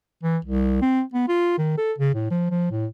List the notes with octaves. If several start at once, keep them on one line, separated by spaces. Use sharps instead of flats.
E3
C2
C4
B3
F4
D#3
A4
C#3
A2
F3
F3
A2